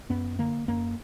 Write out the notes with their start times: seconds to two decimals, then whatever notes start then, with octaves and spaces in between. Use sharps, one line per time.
0.10 F#2 B3
0.38 D3 A#3
0.68 F#2 A#3